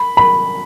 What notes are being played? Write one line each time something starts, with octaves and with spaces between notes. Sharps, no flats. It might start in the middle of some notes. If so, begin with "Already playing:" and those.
Already playing: B5
B5